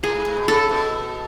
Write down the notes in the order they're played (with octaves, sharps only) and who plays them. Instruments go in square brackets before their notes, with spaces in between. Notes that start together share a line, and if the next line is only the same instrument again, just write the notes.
[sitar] A2 [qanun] G#4
[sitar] G#2
G#2
B2
[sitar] C#3 [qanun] A4
[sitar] B2